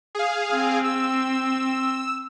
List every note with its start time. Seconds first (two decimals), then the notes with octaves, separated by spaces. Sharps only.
0.15 G#4 F5
0.53 C4
0.84 E6